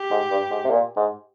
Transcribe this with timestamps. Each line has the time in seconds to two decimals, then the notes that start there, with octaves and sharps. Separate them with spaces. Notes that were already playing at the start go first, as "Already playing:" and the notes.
Already playing: G4
0.10 G#2
0.31 G2
0.50 G#2
0.64 C3
0.70 A#2
0.96 G#2